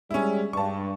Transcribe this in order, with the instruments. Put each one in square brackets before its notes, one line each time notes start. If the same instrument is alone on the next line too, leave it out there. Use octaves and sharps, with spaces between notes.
[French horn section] G3 G#3 [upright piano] C#4 E4
[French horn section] G2 [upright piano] A5 C#6